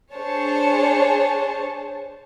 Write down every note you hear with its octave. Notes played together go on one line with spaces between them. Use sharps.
D4 G#4 C5 C#5 A5